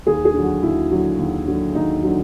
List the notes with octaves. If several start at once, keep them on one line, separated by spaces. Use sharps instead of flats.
D#2 G#4
G#4
D3 F#3
F#4
D#2 E4
D3 F#3
D#2
D3 F#3
D#2 D#4
D3 F#3